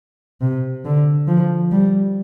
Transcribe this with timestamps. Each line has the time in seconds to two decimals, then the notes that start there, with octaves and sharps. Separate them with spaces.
0.41 C3
0.85 D3
1.28 F3
1.72 G3